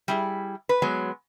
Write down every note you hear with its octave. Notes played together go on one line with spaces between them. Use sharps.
G3 E4 G#4
B4
F#3 G#3 B3